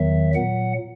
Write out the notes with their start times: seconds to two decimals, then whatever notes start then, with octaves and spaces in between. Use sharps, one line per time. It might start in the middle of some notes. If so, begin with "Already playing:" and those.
Already playing: E2 D#3 F#3 E5
0.35 A#2 F#3 F#5